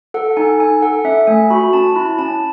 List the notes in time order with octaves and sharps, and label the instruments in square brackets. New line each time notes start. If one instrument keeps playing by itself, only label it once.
[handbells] A4 F#5
D#4 G#5
D#4 G#5
A4 F#5
C#4 E5
A3 G#5
F#4 B5
C#4 A5
E4 B5
C#4 A5